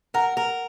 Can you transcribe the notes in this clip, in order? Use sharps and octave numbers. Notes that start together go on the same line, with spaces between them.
A#4 F#5
A#4